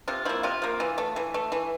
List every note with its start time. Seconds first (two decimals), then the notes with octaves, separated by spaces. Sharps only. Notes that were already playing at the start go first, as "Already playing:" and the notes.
0.08 C3 F4
0.25 F3 A#3 E4
0.43 C3 F4
0.62 F3 A#3
0.80 E3
0.98 A3
1.16 E3
1.34 A3
1.52 E3